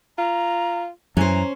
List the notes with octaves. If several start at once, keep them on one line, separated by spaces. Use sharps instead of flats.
F4 A#5
F#2 E3 C#4 C5 A#5